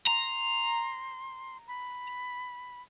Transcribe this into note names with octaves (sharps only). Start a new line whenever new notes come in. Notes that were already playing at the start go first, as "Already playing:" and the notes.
A#5 C6
B5